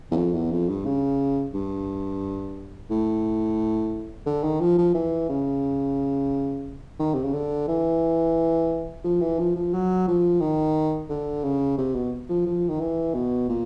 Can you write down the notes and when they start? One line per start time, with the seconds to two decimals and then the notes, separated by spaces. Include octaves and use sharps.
0.11 E2
0.17 F2
0.33 E2
0.52 F2
0.69 G2
0.86 C#3
1.54 G2
2.90 A2
4.26 D3
4.44 D#3
4.60 F3
4.78 F3
4.94 E3
5.29 C#3
6.99 D#3
7.14 C3
7.24 C#3
7.33 D3
7.68 E3
9.04 F3
9.21 E3
9.39 F3
9.56 F3
9.73 F#3
10.08 F3
10.41 D#3
11.10 D3
11.44 C#3
11.78 C3
11.95 B2
12.29 F3
12.46 F3
12.69 D#3
12.80 E3
13.14 B2
13.49 A#2